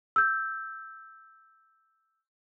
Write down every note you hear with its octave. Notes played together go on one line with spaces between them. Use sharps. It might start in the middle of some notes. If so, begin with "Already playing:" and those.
E6 G6